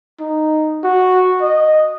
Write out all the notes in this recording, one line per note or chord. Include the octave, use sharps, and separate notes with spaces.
D#4
F#4
D#5